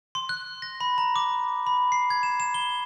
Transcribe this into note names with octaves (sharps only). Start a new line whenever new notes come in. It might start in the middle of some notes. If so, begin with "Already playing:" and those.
C6
F#6
A#6
B5
A#5
D6
B5
C7
G#6
E7
E7
G7